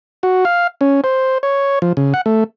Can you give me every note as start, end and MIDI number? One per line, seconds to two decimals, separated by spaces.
0.23 0.45 66
0.45 0.67 77
0.81 1.01 61
1.04 1.38 72
1.43 1.79 73
1.82 1.93 53
1.97 2.14 49
2.14 2.21 78
2.26 2.44 57